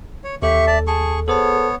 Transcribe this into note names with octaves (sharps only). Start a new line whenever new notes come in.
C#5
D#2 G4 A4 E5 C#6
D5 A5
G#4 A5 C#6
B3 G#4 A4 C5 C#5 A5